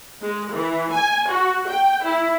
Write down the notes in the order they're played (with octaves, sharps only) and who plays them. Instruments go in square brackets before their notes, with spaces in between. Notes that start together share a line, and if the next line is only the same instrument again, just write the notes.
[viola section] G#3
E3
G#5
F#4
G5
E4